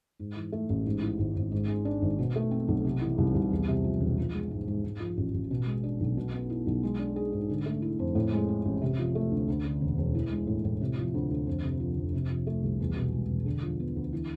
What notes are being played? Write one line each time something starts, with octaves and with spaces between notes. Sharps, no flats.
G#2
E3
A3
A1
G#2
E3
G#1
G#1
G#2
G#3
D4
G#1
B2
A3
C4
B1
C3
E3
C2
C2
E2
C3
F3
E1
F3
G#3
G#2
G#2
G#2
F3
A1
A1
B2
G#3
D4
B1
B2
B3
E4
B1
G#3
D4
G#4
G#2
D3
A3
E4
F2
A2
G#3
C4
A1
C3
F3
A3
D2
D2
D3
E1
E1
E3
G#3
A2
A2
C3
F3
D2
D2
F2
C3
F3
F1
C3
F3
A3
C2
E2
B2
G#3
E1
D3
F3
B3
D2
E3